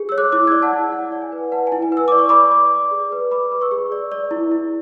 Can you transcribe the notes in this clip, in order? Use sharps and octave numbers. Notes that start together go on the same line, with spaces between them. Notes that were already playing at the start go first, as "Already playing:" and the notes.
Already playing: G#4
C#5 E6
D6 F#6
E4 D6 F#6
D5 E6 G#6
F#5 A5
E4
E4 F#5
D5
G#5
B4
B4 F#5 A5
G#5
E4
G#5
B4 E6
D5 D6
C#6
D5 B5 D6
D5
D5
G#4
B4
B4 B5 D6
B4
C#6 E6
G#4
D5
D5
E4
E4